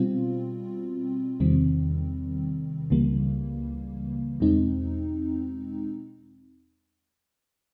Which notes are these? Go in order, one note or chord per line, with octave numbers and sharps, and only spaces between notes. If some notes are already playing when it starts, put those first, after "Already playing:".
Already playing: B2 G3 C4 F4
E2 C3 D#3 G3 C4
C#2 C#3 E3 G3 A#3
E2 B2 G#3 C4 D#4